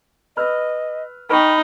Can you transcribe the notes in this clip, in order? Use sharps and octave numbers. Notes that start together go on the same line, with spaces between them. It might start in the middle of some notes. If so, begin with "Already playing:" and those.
B4 D#5 E6 F6
D#4 G5 B5 C#6 F6